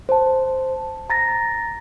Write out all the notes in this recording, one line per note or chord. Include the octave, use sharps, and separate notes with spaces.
C5 A5
A#5 A6 A#6